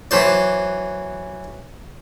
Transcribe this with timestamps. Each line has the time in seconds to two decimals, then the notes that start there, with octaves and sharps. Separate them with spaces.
0.11 E3 F#3 C5 D5